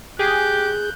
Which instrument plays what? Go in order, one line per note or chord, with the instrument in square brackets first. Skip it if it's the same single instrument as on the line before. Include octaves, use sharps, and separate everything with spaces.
[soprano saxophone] G4 [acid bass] G#4 [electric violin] F#6 G6